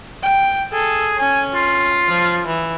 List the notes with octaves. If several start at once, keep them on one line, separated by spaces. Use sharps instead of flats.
G5
G#4 A4
C#4 G#5
F4
F3
E3